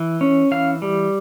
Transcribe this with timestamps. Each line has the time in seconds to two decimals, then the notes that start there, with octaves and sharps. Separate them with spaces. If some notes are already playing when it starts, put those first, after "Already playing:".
Already playing: E3
0.21 C#4
0.51 E3 F5
0.82 G3